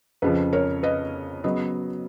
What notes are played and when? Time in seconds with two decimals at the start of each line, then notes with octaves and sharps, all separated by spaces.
0.22 F2 C#3 F3 B4
0.53 A#4 C#5
0.83 B4 D#5
1.44 C#3 F#3 B3 D#5